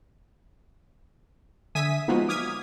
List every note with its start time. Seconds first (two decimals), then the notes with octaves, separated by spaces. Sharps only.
1.75 D3 E5 G#5 D#6 B6 D#7
2.08 F3 F#3 G#3 A#3 B3 D#4
2.28 D6 D#6 F6 G#6 B6